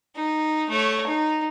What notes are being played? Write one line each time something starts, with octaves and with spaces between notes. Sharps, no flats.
D#4
A3 C#5
D#4